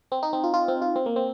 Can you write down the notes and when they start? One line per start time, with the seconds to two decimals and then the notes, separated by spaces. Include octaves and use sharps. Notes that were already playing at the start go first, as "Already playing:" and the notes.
0.12 C4
0.23 D#4
0.33 C4
0.44 F4
0.54 F4
0.68 C4
0.82 F4
0.96 C4
1.06 A#3
1.16 C4